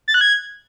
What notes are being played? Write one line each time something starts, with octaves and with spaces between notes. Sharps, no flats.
A6
F#6
G#6